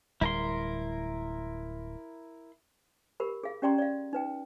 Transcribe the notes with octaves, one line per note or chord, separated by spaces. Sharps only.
D1 G3 E4 A#4 C6
G4 A#4 B5
G#4 F5
C#4 G4 D5 G5 A#5 C6
D5 F5
D#4 B4 G5